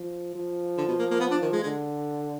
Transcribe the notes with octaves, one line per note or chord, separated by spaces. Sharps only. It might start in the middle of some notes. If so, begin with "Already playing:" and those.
Already playing: F3
F3
D3
B2
A#3
A#3
B3
D4
D#3
G#3
D3 G#3